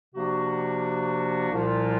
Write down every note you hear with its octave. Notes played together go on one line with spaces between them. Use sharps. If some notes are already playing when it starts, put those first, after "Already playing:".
C3 F3 A#3 D4 F#4
C2 A#2 F3